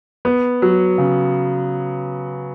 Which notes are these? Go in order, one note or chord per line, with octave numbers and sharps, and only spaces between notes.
B3
F#3
C#3